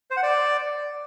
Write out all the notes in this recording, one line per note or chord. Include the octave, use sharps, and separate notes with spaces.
C5
F#5
D5